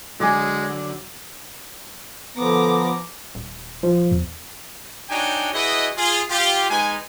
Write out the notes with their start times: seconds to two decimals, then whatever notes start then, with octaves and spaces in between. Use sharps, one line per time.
0.20 D3 F#3 G#3 G#5 D6 A#6
2.37 D3 F3 B3 A#5 D6
3.35 D#1
3.83 F3
4.11 E2
5.10 D4 D#4 F#4 C#5 G5 G#5
5.54 E4 F#4 G#4 B4 D#5
5.97 F4 G#4
6.30 F4 G4
6.70 G#3 D#4 B4 G#5